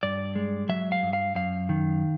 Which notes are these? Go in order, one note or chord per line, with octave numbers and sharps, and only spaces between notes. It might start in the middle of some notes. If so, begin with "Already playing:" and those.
G2 D5
G#3
F#3 E5
F5
G2
F5
F#2 F5
D#3